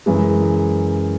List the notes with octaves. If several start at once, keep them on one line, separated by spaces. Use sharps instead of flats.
F#2 C#3 E3 G#3